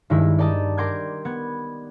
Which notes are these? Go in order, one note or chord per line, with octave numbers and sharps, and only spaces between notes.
G2 D#3 G#3 E4
D5 D#5 G5 A5 A#5 D#6
A#4 G5 C6 D6 G6 G#6
B3 G#6